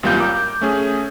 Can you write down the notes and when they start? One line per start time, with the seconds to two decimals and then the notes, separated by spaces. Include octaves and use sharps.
0.03 G#1 F#2 G3 A#3 F4 G6
0.19 A#4 D6
0.61 A3 C#4 G#4